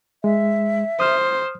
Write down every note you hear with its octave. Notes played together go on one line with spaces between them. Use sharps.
G#3 E5
C5 D#6 F6